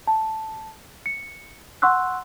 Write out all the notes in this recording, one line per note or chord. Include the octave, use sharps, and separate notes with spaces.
A5
C#7
F#5 C6 C#6 E6 F#6